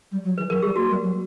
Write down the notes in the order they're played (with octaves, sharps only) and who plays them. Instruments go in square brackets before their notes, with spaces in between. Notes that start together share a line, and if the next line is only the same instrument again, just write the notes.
[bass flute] G3
F#3
[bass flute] E3 [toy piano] B4
[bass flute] F#3 [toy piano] A#4
[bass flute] G3 [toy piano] G4
[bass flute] A#3 [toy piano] F#4
[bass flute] G3
F#3